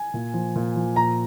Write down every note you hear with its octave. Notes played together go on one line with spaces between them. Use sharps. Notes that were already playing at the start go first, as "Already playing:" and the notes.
Already playing: G#5
A#2
F3
A#2
F3
A#2 A#5